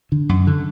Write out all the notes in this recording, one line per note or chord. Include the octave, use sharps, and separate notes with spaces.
D3
F#2
D3